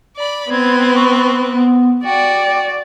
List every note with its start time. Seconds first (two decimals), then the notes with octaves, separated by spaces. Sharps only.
0.16 D5 B5
0.49 B3 C4 G#6
0.96 C#6
1.53 B3
2.05 F#4 D5 G5